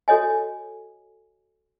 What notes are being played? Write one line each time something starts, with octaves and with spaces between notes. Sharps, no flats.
F#4 A4 C#5 D#5 G#5